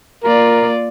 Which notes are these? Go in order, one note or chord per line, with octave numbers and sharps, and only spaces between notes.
A#3 F4 A#4 D5